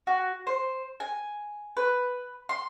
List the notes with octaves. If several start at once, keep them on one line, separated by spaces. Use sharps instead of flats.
F#4
C5
G#5
B4
C6